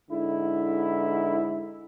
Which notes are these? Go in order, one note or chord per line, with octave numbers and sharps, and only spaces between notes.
G#2 D3 E4